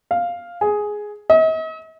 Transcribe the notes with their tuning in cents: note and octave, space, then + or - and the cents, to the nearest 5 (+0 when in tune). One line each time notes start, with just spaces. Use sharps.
F5 +0
G#4 +5
D#5 +45